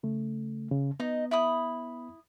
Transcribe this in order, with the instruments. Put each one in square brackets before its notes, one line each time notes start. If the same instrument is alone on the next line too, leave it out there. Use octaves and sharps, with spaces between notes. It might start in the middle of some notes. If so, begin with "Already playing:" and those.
[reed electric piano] C#3 A3
C#3
[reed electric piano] B3 [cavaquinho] D#4 D#5
[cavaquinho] E4 B5 D#6